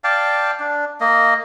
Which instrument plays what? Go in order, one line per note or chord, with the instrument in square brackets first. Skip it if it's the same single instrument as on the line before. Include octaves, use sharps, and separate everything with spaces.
[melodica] D5 F5 G5 A5
D4
A#3 D#5